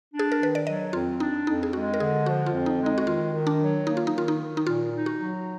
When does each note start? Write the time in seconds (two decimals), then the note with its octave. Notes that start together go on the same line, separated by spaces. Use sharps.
0.13 D4
0.19 G#4
0.32 A#4
0.40 D#3 B4
0.55 D5
0.66 F#3 D#5
0.93 F2 F4
1.20 D4 D#4
1.46 F2 D#4
1.63 G#4
1.73 G#3 F#4
1.94 A#4
2.00 D3 G#4
2.26 F3 F#4
2.46 F4
2.53 F2
2.66 D#4
2.80 G#3
2.86 D#4
2.98 F#4
3.06 D#3 F4
3.33 D#3
3.47 D4
3.61 F#3
3.86 A#3 D#4
3.97 F4
4.07 D#4
4.14 D#3 F4
4.28 D#4
4.41 D#3
4.57 D#4
4.66 A#2 F4
4.94 D#4
5.06 F#4
5.19 F#3